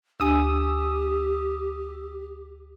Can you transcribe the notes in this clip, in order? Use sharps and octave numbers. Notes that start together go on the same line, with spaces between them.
D2 D4 G4 G#5 D#6 E6